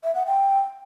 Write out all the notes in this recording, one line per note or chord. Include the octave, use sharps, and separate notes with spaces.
E5
F#5
G5